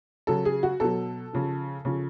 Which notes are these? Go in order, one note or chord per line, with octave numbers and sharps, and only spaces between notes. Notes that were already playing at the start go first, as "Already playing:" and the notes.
C#3 F#3 A4
G#4
F#4
B2 F#3 A4
C#3 F3
C#3 F3